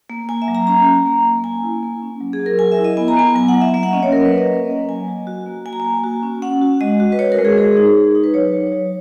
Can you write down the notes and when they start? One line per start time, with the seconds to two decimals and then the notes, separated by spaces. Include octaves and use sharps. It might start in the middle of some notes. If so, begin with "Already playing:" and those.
0.10 A#3
0.29 A#3 G#5
0.42 E5
0.48 F#3
0.55 A#5
0.67 C#4 A#5
0.86 A#3
1.06 A#3
1.25 A#3
1.44 A#3 G#5
1.63 E4
1.83 A#3
2.02 C#4
2.20 F#3
2.33 G#4
2.39 F#3
2.46 A#4
2.59 F#3 G#5
2.72 E5
2.78 E4
2.85 D#5
2.97 B3 G#5
3.08 A#5
3.17 B3 G#5
3.35 F#3 G#5
3.48 F#5
3.55 F#3
3.61 E5
3.74 A#3 E5
3.83 F#5
3.93 C#4 D#5
4.03 C#5
4.12 F#3 A#4
4.25 B4
4.32 A#3
4.38 D#5
4.51 C#4
4.70 A#3
4.89 F#3 G#5
5.08 F#3
5.27 F#4
5.46 A#3
5.66 A#3 G#5
5.73 A#5
5.80 A#3 G#5
6.04 F#4
6.23 C#4
6.42 C#4 F#5
6.62 F#4
6.81 G#3 D#5
7.00 F#4
7.12 B4
7.19 F#4 C#5
7.32 A#4
7.38 G#3
7.45 G#4
7.57 G#3 G#4
7.77 D#4
7.96 D#4
8.15 D#4
8.24 B4
8.34 F#3 C#5
8.53 F#3
8.72 F#3